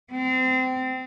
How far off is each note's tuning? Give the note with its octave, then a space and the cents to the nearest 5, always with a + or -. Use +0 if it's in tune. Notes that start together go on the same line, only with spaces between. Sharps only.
C4 -25